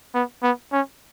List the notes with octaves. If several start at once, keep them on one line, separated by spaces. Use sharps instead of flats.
B3
B3
C#4